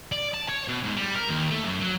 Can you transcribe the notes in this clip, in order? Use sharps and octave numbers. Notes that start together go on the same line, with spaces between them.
D5
A5
C#5
B2
G#2
G3
A#4
D#2
A3
F#2
F#3